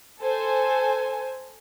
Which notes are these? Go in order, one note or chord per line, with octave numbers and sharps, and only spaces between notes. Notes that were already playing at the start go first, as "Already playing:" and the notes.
A4 C5 G#5